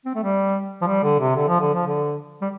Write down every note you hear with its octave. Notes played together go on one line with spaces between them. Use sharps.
C4
A3
G3
F3
G3
D3
C3
D3
F3
D3
F3
D3
G3